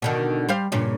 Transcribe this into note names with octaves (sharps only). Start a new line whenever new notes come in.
B2 D3 D#3
G3 C5 F5
G2 A#2 C#3